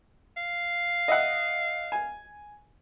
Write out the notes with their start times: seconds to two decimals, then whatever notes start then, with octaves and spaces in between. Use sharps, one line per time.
0.37 F5
1.08 D#5 E5 F#5
1.92 G#5